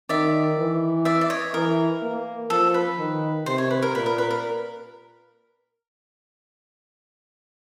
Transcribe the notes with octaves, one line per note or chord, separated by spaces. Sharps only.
D#3 D5 E5
E3
D5 E5
D5
C#5 D#5
E3 A#4
A#3
F3 A4
B4
D#3
C3 C5
C#5
B4
A#4
A#2 B4
A#4
B4
A#4